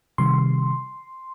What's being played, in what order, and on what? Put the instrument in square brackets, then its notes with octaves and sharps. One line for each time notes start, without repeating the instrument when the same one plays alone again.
[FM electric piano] C3 D#3 G3 C6